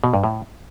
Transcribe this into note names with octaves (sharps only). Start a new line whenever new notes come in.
B2
G2
A2